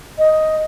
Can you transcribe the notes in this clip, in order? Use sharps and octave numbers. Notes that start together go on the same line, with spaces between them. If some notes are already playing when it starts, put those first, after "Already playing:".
D#5